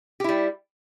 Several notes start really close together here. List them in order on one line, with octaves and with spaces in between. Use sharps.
G4 E4 G3